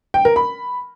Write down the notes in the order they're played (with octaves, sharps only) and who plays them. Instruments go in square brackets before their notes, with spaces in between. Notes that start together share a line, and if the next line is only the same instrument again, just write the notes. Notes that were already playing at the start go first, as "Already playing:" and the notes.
[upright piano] G5
A#4
B5